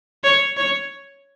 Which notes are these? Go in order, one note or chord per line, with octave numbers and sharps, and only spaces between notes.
C#5
C#5